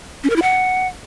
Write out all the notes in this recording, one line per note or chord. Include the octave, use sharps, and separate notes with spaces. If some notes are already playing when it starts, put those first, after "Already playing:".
C#4
A#4
E4
F#5